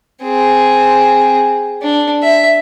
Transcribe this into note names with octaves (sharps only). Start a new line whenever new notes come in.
C4 G#4
D4
E5